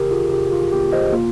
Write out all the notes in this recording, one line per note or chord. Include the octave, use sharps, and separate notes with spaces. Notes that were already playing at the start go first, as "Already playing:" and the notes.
Already playing: C3 D#3 G4 A#4
F4 G#4
C3 G4
F4
A#3 G4
C5 D#5
A#3 F4